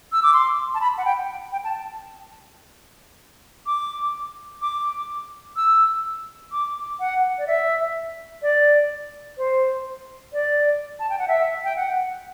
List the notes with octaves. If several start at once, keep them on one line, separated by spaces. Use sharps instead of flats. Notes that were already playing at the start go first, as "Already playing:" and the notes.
E6
D6
C6
A5
B5
F#5
G5
G5
A5
D6
D6
E6
D6
F#5
D5
E5
D5
C5
D5
A5
G5
F#5
E5
G5
F#5